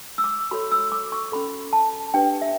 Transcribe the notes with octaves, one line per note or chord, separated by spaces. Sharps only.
E6
D6
F#4 A4 C#5 B5
E6
D6
C#6
C#4 F#4 A4 B5
A5
D4 G4 B4 G5
E5